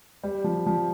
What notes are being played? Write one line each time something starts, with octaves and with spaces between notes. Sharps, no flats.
G3
F3
F3